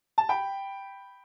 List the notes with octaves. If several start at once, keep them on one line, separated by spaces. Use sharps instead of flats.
A5
G5 B5